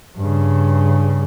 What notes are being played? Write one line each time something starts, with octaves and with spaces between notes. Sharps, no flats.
G2 C#3